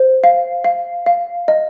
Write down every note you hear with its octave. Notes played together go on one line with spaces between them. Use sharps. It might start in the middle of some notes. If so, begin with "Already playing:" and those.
Already playing: C5
F5
F5
F5
D#5